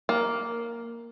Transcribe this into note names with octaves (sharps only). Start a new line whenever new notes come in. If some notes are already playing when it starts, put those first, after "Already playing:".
A#3